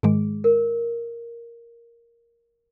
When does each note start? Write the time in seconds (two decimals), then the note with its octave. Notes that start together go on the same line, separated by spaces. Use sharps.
0.03 G#2 D#3 G#3 G#4
0.44 A#4